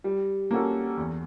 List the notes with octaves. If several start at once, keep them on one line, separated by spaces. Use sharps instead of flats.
G3
A#3 C#4 F#4 A4
E2